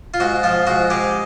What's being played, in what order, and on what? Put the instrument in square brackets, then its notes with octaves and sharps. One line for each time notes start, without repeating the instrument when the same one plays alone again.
[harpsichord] F4
G#2 F#4
F3 F4
G#2 F#4
G#3 G4